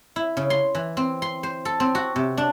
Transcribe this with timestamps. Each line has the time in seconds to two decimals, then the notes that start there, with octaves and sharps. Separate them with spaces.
0.16 E4
0.37 C#3
0.50 C6
0.75 E3
0.97 C4
1.22 C6
1.43 C5
1.65 A4
1.80 C4
1.95 F#4
2.16 C3
2.38 D4